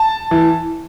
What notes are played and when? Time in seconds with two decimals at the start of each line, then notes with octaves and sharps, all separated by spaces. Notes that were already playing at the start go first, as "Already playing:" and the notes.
Already playing: A5
0.31 E3